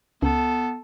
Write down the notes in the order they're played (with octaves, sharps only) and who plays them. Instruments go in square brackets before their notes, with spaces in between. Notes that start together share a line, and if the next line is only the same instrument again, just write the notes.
[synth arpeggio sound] C#2 [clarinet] B3 [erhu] A4